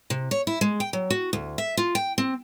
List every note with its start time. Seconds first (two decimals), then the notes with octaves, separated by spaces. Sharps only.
0.10 C3
0.31 C#5
0.47 E4
0.61 G#3
0.80 G5
0.93 F#3
1.10 F#4
1.33 D2
1.58 E5
1.77 F4
1.95 G5
2.18 C4